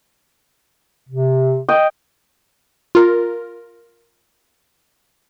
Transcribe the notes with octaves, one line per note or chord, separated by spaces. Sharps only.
C3
D#5 G5
F4 A#4